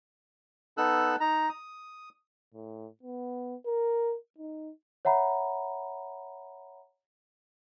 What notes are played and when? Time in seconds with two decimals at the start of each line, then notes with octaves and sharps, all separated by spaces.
0.78 B3 D#4 A4 E6 F#6
1.20 D#4 A#5
1.49 D#6
2.54 A2
3.03 B3
3.66 A#4
4.38 D#4
5.05 C#5 E5 F#5 A#5 B5